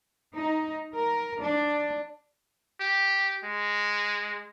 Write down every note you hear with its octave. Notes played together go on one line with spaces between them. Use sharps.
D#4
A#4
D4
G4
G#3